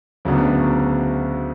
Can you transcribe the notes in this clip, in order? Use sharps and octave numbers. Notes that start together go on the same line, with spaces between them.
D2 C#3 F#3 B3 D4